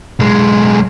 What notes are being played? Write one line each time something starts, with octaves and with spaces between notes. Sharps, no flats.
B1 G#3